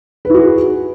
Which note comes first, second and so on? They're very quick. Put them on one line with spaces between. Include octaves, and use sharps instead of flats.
B4 E4 F#4 G#4